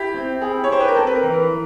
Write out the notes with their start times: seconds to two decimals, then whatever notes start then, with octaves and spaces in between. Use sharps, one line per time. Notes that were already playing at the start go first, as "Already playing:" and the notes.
Already playing: E4 G4
0.14 C4
0.41 E4 G#4
0.64 C#5
0.70 G4 C5
0.80 B4
0.88 A#4
0.96 C4 A4
1.07 B4
1.15 A#4
1.23 E3
1.33 A#4